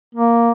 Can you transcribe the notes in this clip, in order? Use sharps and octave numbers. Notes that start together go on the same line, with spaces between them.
A#3